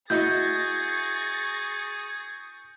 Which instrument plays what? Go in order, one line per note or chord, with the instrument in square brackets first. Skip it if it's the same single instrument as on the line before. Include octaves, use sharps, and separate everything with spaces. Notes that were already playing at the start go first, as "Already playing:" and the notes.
[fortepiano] E4 F#4 D#5 [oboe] G#4 [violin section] C#6 A6 A#6 [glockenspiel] G6